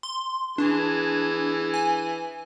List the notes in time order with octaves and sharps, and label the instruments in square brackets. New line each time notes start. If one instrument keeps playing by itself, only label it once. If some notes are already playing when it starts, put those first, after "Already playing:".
[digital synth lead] C6
[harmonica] E3 G#4 [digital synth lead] D4
[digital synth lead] G#5